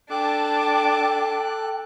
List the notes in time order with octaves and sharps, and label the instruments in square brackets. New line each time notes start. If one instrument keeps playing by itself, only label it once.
[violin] D4 A5 [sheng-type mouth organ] A4 F#6 [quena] G5 [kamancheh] D6